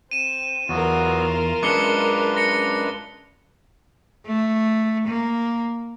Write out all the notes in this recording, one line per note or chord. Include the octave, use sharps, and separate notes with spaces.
C4 D#7 E7
E2 F#3 B3 F4 F#4 A#4
F#2 G#3 C#4 D4 B4 D6 C#7 G7
A#6 C#7
A3
A#3